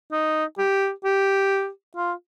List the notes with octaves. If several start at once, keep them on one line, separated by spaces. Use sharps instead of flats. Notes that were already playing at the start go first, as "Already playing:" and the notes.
D#4
G4
G4
F4